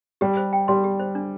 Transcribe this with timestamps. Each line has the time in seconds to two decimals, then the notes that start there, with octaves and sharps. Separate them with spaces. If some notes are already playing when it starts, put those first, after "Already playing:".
0.21 G3 G4
0.37 C5
0.53 G5
0.68 G3 C6
0.84 G4
1.00 C5
1.15 D4